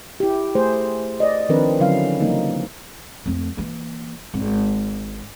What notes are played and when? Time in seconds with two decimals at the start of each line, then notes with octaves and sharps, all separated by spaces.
0.20 E4 G4
0.55 A3 G#4 C5
1.20 D5 D#5
1.49 D#3 F3 C4 D4 A#4 B4
1.80 D3 F#3 C#4 E4 F5
2.21 C#3 F3 G3 A#3 D#4
3.26 F2 A3
3.57 E3 A#3
4.34 G#1